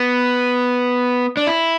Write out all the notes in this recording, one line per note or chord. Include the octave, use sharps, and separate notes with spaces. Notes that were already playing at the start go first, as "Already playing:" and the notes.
Already playing: B3
D4
E4